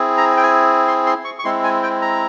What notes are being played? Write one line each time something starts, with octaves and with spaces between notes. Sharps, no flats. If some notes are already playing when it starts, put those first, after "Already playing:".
Already playing: C4 E4 G#4
A#5
G5
G#5
C6
C6
C#6
C#6
G#3 C4 E4 C6
G#5
G5
A#5